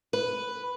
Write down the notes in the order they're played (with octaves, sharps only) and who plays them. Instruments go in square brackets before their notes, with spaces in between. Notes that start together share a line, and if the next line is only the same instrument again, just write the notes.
[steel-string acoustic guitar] B4